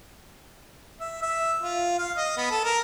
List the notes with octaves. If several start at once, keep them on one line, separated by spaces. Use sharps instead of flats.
E5
E5
F4
F5
D#5
B3
A4
A#4